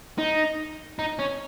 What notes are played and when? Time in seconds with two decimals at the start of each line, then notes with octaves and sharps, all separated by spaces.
0.19 D#4
0.99 D#4
1.19 C#4